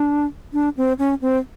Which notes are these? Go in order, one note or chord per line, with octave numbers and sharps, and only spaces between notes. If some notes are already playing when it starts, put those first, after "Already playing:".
Already playing: D4
D4
C4
C#4
C4